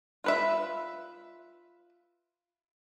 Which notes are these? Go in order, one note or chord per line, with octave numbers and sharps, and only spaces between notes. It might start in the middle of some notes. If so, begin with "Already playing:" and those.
F4 B4 E5